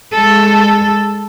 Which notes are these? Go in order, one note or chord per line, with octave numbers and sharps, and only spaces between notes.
G#3 A4